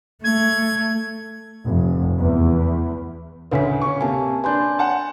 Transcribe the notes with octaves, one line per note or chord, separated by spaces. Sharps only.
A3 G#6
F1
E2
A1 D2 C#3 B4 G#5 B6
C#4 C#6
C3 A#3 G#5 A5
D4 B4 G#5 C6 G6
F#5 A5